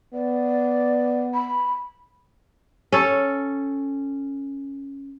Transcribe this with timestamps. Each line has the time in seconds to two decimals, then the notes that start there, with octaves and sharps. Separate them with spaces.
0.14 B3 D5
1.34 B5
2.92 C#4 A4